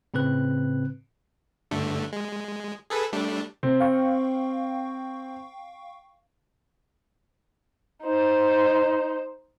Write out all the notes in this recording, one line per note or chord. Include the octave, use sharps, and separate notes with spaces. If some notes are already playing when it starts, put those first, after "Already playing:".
A2 C#3 C4 B4 F#6
G2 D3 A3
G#3
G#4 A4 B4
G3 A3 D4
C3 C4
F5 G5 C#6
D#4 C5